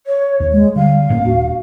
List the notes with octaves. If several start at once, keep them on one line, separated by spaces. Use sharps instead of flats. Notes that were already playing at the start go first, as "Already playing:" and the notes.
C#5
D#2 C#5
G#3
D3 G3 F5
G1 A2 A#3 C#4
D#1 D4 F#4